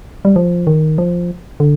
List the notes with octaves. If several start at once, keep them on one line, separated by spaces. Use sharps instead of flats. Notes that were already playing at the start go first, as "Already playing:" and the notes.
G3
F3
D#3
F3
D3